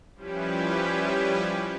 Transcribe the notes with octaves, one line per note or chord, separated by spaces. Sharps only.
F3 G3 C#4 E4 G4 B4